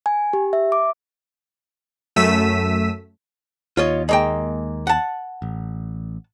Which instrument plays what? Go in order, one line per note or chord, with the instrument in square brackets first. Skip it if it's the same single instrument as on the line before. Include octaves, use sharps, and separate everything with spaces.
[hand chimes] G#5
G4
E5
D6
[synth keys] F#2 A3 E6 B6 D#7
[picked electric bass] D#2 [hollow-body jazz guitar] F4 C#5 D#5
[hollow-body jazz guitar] G#3 A#3 G5
F#5 A5
[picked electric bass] A1